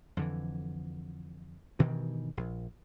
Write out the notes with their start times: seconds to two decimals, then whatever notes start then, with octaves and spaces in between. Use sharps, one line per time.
0.17 F2 D3 E3
1.79 G2 B2 D#3 E3
2.37 A#1